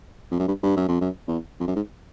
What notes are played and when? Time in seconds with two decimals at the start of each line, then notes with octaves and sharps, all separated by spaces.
0.31 F2
0.39 F#2
0.48 G2
0.63 G2
0.77 F#2
0.88 F2
1.01 F#2
1.28 E2
1.60 F2
1.68 F#2
1.76 G#2